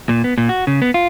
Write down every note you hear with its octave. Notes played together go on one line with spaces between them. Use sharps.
A#2
B3
A#2
F#4
C#3
B3
F4